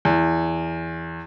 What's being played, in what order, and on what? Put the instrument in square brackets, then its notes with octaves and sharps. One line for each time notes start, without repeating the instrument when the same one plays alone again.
[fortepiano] E2